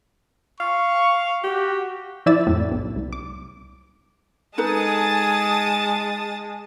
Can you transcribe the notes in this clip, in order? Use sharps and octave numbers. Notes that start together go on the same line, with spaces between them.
F5 C#6
F#4 G4
F3 E4 D5 E6 A6
F2 A2
B1
C2
D6
G#3 D#4 G#4 A4 B4 A5 D#6 A6